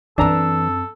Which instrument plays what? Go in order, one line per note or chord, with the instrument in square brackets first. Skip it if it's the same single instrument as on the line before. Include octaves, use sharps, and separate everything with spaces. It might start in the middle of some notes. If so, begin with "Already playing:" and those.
[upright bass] F#2 C4 [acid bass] E3 [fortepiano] D4 A#5 [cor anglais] A4